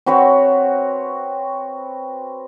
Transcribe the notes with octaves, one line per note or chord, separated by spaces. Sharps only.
C4 F#4 B4 C#5